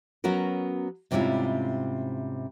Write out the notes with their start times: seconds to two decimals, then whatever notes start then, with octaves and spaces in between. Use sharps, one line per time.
0.24 F#3 B3 C#4 F#4 A#4
1.11 G#2 C3 G3 C#4 E4 F4